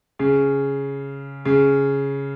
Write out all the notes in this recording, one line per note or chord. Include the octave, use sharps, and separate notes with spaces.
C#3
C#3